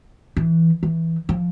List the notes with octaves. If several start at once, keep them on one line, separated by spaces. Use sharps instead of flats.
E3
E3
F3